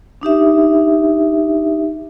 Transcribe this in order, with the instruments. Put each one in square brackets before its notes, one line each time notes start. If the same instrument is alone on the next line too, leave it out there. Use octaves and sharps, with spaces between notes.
[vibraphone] D4 D#4 G4 E5